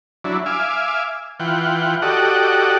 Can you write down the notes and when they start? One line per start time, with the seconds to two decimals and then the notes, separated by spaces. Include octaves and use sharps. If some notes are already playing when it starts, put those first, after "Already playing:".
0.24 F#3 D4 E4
0.46 E5 F5 G#5 D6
1.40 E3 F4 F#5 G5
2.02 F#4 G4 A4 D5 D#5 F#5